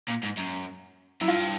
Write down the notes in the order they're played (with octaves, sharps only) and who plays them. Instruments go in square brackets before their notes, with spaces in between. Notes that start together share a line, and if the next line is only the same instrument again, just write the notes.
[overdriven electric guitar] A#2
G#2
F#2
[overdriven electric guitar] F#2 [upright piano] E4
[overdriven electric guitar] G2 [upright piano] F4